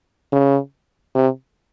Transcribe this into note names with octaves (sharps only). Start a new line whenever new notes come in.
C#3
C3